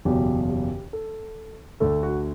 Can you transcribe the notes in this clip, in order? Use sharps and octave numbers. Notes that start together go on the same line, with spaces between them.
F#1 E2 B2 F#3 G4
G4
A4
D2 D3 A3 A4
F#4